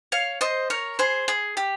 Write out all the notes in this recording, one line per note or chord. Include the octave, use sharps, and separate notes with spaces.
C#5 F5
C5 D#5
A#4 C#5
G#4 C5
G#4
G4